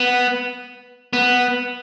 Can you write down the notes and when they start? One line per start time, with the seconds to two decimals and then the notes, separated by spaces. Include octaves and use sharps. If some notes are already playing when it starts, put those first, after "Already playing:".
Already playing: B3
1.13 B3